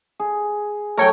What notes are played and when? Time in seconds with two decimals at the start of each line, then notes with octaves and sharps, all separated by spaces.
0.19 G#4
0.97 F#3 A3 A#4 C#5 G5